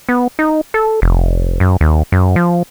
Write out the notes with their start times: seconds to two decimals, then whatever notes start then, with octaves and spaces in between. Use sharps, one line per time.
0.09 B3
0.39 D#4
0.74 A4
1.02 F1
1.60 F#2
1.81 D#2
2.12 F#2
2.36 F3